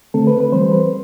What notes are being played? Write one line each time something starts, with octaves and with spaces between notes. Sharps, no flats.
D3 A3 C4 A4
B4
B4
E3 G3 C4 C5
B4